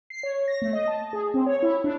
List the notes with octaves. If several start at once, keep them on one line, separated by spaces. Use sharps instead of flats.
C7
C#5
A#6
A3
D#5
A5
G#4
C4
C#5
E4
D4